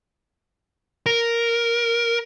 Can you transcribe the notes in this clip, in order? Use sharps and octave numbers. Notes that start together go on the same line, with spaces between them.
A#4